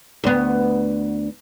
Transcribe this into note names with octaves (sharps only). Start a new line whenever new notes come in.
D2 B3